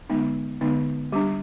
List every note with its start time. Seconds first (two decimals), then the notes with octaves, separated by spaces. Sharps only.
0.09 D3 G#3 B3 D#4
0.61 D3 G#3 B3 D#4
1.12 G3 D4 G4